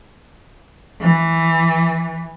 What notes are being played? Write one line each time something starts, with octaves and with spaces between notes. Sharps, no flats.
E3